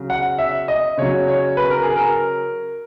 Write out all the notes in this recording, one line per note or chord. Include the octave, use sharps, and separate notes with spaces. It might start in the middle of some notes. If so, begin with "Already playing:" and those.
Already playing: C#3 F#3
F#5
E5
D#5
C#3 F#3 C#5
C#5
B4
A#4
G#4
A#4